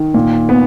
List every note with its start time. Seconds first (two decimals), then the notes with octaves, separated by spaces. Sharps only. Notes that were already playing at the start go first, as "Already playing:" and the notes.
Already playing: D#3
0.14 A#2
0.49 B3